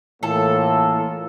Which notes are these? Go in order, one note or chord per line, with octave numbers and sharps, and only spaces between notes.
A2 E3 A#3 F4 A4